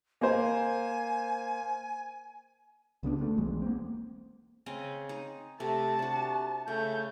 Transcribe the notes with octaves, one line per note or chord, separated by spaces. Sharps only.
A#3 C5 G#5
C#2 C#3 B3 D4
D2 A3
E1 B1 E2 G#3
A#3 C4
C#3 C4 D#5
D#4
C3 A3 A5
C3 D4 F#4
C#3 A3 G6